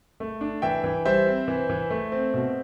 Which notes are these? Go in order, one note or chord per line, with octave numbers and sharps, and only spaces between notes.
A3
D4
E3 E5 G5
E3
G3 C5 E5
C4
E3
E3
A3
C4
B2